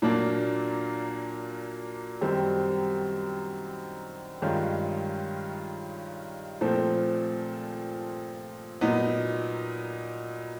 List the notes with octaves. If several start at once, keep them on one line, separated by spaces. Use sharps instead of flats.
A#2 F#3 A#3 D4
F#2 D#3 G3 C4
G2 D#3 G#3 C#4 F4
A#2 F3 A3 C4
A#2 F#3 B3 D#4